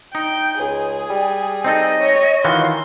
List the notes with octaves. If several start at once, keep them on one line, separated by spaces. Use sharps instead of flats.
D#4 G5
C#2 G#4
G3
C4 D#4 A4 D#5
C#5
D#3 E3 F4 F#4 C6